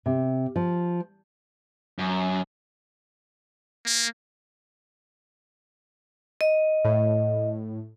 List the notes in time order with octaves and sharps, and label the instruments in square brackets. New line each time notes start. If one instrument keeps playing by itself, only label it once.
[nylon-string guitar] C3
F3
[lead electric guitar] F#2
[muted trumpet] A#3
[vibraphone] D#5
[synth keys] A2